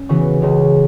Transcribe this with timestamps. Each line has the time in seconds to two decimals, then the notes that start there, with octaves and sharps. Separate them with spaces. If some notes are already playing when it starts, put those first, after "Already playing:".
Already playing: C#4
0.09 C#3 E3 B3 F#4
0.42 C#2 C#3 G#3